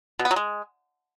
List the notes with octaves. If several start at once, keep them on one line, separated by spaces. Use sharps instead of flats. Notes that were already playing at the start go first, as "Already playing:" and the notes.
B2
B3
F#3
G#3